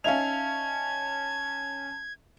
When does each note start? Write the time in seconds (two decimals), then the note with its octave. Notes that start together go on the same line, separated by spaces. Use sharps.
0.04 C#4 D#4 E5 F5 A5 G#6 F7